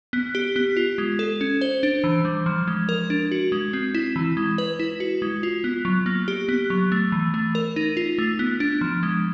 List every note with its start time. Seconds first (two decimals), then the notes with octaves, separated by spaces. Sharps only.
0.13 B3
0.35 G4
0.56 B3
0.77 F4
0.98 G#3
1.19 A4
1.41 C#4
1.61 C5
1.83 D4
2.04 E3
2.25 G3
2.46 F3
2.68 G#3
2.89 A#4
3.10 D4
3.32 F#4
3.52 G#3
3.73 C4
3.94 E4
4.16 E3
4.37 G#3
4.58 B4
4.79 E4
5.00 F#4
5.22 G#3
5.43 F4
5.64 B3
5.85 F#3
6.06 A#3
6.28 G4
6.49 B3
6.70 F#3
6.92 A3
7.12 E3
7.34 A3
7.55 A#4
7.76 D#4
7.97 F4
8.18 A3
8.39 B3
8.60 D4
8.81 F3
9.03 G#3